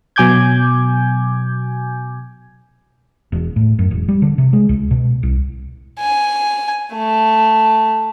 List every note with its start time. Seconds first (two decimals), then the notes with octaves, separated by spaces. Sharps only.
0.16 B2 F#3 G#5 D6 G6 G#6
3.32 E1
3.56 A2
3.79 F#2
3.91 E1
4.08 G3
4.22 D3
4.38 C3
4.53 G#3
4.69 C#2
4.91 B2
5.23 C2
5.99 G#5
6.94 A3